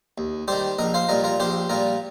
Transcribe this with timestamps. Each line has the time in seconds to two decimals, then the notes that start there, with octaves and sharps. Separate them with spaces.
0.18 D#2
0.48 D#3 G3 G4 C5
0.78 A#1 A#4 D#5
0.94 C5 F5
1.09 A#2 G3 A#4 D#5
1.24 F4 A#4
1.40 A#1 G4 C5
1.69 A#2 G3 F4 A#4